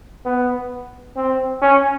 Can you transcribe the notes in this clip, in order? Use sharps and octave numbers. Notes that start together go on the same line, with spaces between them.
B3
C4
C#4